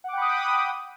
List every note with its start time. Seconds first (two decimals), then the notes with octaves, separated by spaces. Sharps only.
0.04 F#5
0.08 D6
0.13 G5
0.17 B5
0.21 D#6